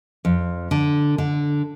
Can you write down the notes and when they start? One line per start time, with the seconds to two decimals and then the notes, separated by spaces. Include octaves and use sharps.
0.25 F2
0.71 D3
1.18 D3